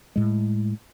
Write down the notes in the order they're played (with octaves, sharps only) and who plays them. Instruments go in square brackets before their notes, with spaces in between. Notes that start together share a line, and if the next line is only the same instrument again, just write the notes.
[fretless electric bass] A2 G#3